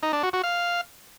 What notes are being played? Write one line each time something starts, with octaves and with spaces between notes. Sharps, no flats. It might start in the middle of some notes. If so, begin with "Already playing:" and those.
D#4
D4
F#4
F#4
F5